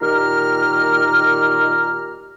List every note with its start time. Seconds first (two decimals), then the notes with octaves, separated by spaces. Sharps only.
0.01 A#2 D#3 G4 A#5 F6